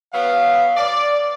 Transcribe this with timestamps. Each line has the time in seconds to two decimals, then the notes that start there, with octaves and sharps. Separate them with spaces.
0.14 F#3 B3 F5
0.77 D5